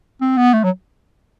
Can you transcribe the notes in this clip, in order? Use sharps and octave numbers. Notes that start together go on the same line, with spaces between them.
C4
B3
A3
F#3